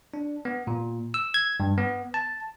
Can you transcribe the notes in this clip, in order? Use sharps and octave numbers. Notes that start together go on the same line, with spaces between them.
D4
B3
A#2
E6
G#6
G2
B3
A5